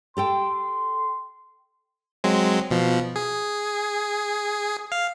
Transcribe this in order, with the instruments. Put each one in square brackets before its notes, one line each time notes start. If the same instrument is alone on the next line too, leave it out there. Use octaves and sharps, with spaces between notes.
[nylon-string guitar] G4 A4 G5 [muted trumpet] C6
[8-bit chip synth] F#3 G#3 C4
B2 F3
G#4
F5